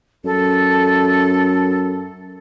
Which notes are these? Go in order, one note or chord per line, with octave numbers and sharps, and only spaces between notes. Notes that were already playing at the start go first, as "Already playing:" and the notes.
F#2 A4